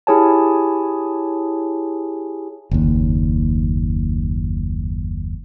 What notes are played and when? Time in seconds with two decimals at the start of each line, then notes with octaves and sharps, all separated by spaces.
0.07 E4 G4 G#4 C#5 G#5 A5
2.71 F#1 D#2